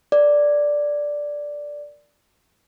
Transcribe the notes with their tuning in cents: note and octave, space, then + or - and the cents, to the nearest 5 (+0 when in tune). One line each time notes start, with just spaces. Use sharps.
A#4 +0 D5 +0